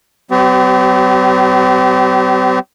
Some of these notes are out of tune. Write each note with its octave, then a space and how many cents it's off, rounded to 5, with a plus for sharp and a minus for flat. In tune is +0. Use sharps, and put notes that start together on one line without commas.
F#3 +40 C4 -45 G4 -30